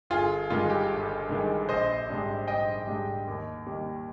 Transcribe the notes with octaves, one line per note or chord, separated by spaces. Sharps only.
G1 F4 G#4
G2 D#3 G#3 F4
G4
G1
G2 D#3 G#3
A#1 C5 D#5
G#2 G3 D4
A#1 D#5 G5
G#2 G3 D4
D#2
D#3 G3 A#3